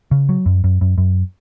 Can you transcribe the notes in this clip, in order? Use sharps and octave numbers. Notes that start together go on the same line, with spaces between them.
C#3
F#3
F#2
F#2
F#2
F#2